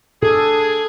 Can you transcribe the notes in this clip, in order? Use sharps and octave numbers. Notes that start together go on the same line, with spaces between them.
D4 G#4 A4